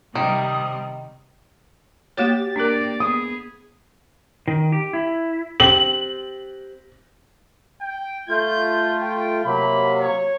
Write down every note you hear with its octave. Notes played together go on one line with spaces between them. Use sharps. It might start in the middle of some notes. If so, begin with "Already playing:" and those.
C3 D#3 G3 D#6
A#3 F#4 G4 C#5 A6
A#3 D4 A#4 D5
B3 G#4 D#6
D#3
G4
E4
C4 G4 F#7
G5
A3 F4 G6
G5
C3 F#3 A#3 B5
C#5